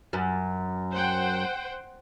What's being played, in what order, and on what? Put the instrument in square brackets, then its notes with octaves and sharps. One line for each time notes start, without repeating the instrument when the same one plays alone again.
[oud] F#2
[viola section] C5 F#5 G5